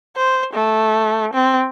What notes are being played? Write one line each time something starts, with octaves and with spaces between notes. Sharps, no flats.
C5
A3
C4